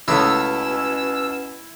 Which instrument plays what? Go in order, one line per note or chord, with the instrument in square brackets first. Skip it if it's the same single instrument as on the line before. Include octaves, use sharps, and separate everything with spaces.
[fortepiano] C#2 A3 D#6 [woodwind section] B2 C#4 [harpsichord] E4 [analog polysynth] E6